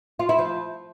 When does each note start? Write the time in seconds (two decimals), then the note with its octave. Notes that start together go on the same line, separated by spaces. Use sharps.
0.19 F4
0.29 E4
0.39 F3